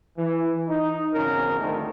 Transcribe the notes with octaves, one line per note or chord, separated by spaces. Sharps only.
E3
D#4
G#1 E2 G#2 C#3 C#4 A#4
F2 D3 D#3 G3 A3 D#4